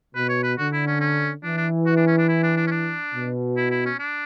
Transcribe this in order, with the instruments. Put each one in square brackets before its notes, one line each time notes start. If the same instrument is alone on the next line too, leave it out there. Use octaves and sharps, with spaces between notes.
[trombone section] B2 [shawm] B4
[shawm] C#5
B4
[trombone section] D3 [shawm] F#4
[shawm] E4
C#4
C#4
[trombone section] E3 [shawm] D4
[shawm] D4
F#4
D4
C#4
D4
E4
D4
D4
C#4
D4
[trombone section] B2
[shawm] E4
E4
C#4
D4